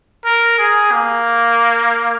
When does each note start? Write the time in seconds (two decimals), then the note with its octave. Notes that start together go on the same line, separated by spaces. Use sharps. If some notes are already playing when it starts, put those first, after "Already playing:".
0.25 A#4
0.59 G#4
0.92 A#3